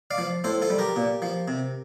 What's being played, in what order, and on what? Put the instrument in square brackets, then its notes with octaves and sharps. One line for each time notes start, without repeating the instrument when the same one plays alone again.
[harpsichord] D5 F5
F3
A2 A4 C5
F4 A4
G3
G4 A#4
A#2
F3
C3